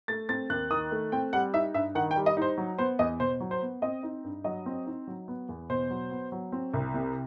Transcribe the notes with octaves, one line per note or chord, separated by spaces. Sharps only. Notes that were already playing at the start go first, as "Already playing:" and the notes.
A3 A6
C4 A6
D#2 F#6
D#3 D#6
A3
C4 G5
G3 F#5
D#4 E5
G2 E5
D#3 F#5
G5
G3
D#5
D#4 C5
F#3
B3 C5
E2 D#5
B2 C5
F#3
C5
B3
C4 D#5
D#4
G2
F#3 D#5
C4
D#4
F#3
B3
E2
B2 C5
F#3
B3
F#3
C4
C2
C3